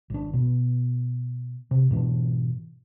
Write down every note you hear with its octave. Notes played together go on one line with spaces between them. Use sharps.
G#1 D4
B2 B3
C3
G#2 B2 E3 D4